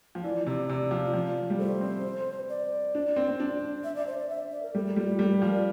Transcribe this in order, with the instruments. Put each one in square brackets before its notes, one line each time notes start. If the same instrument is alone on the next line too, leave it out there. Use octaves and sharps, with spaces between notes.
[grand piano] F3
[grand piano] E3 [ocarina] D5
[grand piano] C3 [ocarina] D5
[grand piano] C3 [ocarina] D5
[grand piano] F3
F3
G3
[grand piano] A3 [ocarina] C5
[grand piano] C4
[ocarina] D5
[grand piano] D4
C4
C4
D4
[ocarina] E5
D5
C5
D5
E5
D5
A#4
[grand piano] G3 [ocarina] A4
[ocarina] A4
[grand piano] G3 [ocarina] F4
[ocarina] F4
[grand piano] G3 [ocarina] A4
[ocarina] A#4
[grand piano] F3 [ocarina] A#4
[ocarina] D5